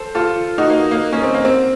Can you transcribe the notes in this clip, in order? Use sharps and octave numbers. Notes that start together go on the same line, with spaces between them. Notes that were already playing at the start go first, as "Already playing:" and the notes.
Already playing: A4 C5
F4 A4
D#4 F#4
A#3
A#3
A#3 C#4
C4
A#3
C4